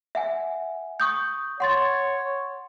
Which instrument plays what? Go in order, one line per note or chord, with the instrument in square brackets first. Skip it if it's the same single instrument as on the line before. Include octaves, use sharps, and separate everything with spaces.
[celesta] E5 F#5 G#5
C#6 D#6 G6
[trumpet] C#5 [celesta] F#5 C6 A6